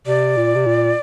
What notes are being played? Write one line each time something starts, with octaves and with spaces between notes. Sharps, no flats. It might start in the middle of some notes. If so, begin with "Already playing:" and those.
C3 D5
A#2
C3
A#2